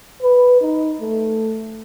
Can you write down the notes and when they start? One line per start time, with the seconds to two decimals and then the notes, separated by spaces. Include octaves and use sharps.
0.22 B4
0.61 D#4
1.01 A3